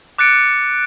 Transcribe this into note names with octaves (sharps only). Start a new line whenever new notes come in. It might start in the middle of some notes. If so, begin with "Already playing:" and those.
D6 F#6 A6 C#7 D7